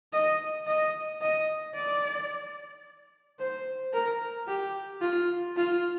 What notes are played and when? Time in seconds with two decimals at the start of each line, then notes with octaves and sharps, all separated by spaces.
0.13 D#5
0.67 D#5
1.22 D#5
1.76 D5
3.39 C5
3.94 A#4
4.48 G4
5.02 F4
5.57 F4